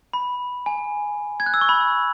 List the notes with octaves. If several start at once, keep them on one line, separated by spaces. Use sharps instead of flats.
B5
G#5
G#6
F#6
E6
C#6
B5